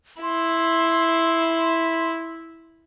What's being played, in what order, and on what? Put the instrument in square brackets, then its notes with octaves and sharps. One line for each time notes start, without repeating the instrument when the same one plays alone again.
[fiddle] E4 [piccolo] C6